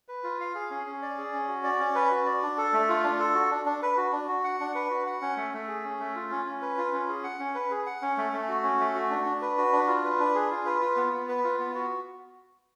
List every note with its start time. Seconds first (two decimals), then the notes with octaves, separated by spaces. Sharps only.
0.08 B4
0.24 F4
0.40 F5
0.55 G#4
0.70 C#4
0.87 C#4
1.02 D5
1.18 G#4
1.33 C#4
1.48 F#4
1.64 D5
1.79 C#4
1.95 B4
2.11 F#4
2.26 D5
2.42 D4
2.58 A4
2.73 A3
2.89 F4
3.04 D4
3.19 A4
3.35 F#4
3.51 D4
3.66 D4
3.82 B4
3.97 F#4
4.12 D4
4.28 F#4
4.44 F#5
4.60 D4
4.75 B4
4.90 F#4
5.06 F#5
5.22 C#4
5.37 A3
5.53 A3
5.68 G#4
5.84 C#4
5.99 A3
6.15 F4
6.31 C#4
6.46 C#4
6.62 B4
6.78 F4
6.93 C#4
7.09 G#4
7.24 F#5
7.39 C#4
7.55 B4
7.71 G#4
7.86 F#5
8.02 C#4
8.17 A3
8.33 A3
8.49 F#4
8.63 C#4
8.80 A3
8.95 F#4
9.11 D4
9.26 D4
9.42 B4
9.58 F#4
9.72 D4
9.88 F4
10.04 B4
10.20 D4
10.35 G#4
10.50 F4
10.66 B4
10.81 F4
10.96 B3
11.13 B3
11.29 B4
11.44 F4
11.59 B3
11.75 F#4